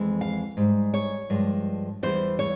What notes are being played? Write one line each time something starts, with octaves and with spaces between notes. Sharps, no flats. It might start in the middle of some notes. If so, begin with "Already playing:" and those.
Already playing: F2 E3 G#3
F5
G#2 G3
C#5
G2 F3 G#3
E2 E3 G3 C5
C#5